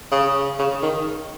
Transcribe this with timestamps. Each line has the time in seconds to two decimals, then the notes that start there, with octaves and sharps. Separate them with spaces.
0.12 C#3
0.59 C#3
0.82 D#3